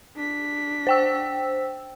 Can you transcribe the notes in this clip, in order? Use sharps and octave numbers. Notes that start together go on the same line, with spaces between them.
D4 B6
C5 G5 E6